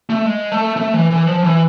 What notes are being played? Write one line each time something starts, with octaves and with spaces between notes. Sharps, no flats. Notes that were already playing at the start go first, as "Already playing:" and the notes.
A3
G#3
A3
A3
E3
E3
F3
E3